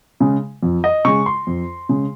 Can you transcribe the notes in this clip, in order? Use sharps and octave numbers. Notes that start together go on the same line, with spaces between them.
C#3 G#3
F2
D#5
C#3 G#3 C#6
C6
F2
C#3 G#3